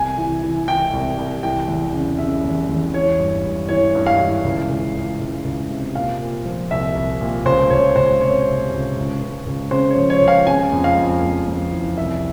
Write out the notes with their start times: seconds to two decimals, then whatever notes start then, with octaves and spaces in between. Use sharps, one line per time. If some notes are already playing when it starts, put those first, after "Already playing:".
Already playing: C2 G#5
0.18 E3
0.42 E3
0.68 E3 G5
0.93 C2
1.18 C2
1.43 E3 G5
1.68 E2
1.93 C#3
2.18 C#3 E5
2.44 E2
2.69 E2
2.94 E3 C#5
3.19 G2
3.44 G2
3.69 E3 C#5
3.95 G2
4.06 F5
4.19 E3
4.44 C#2
4.69 C#2
4.95 C#2
5.20 C#2
5.45 C#2
5.70 C3
5.95 A#2 F5
6.20 A#2
6.46 F3
6.71 C2 E5
6.95 C2
7.21 A#2
7.45 C#2 C5
7.70 C#2 C#5
7.96 C#2 C5
8.21 C3 C#5
8.47 C3
8.71 C#2
8.97 C#2
9.21 C#2
9.46 C#2
9.71 C#3 C5
9.90 C#5
9.96 F3
10.10 C#5
10.22 C#2
10.28 F5
10.47 C#3 G#5
10.72 F2
10.84 F5
10.97 F2
11.22 F2
11.48 F2
11.72 E3
11.97 C2 E5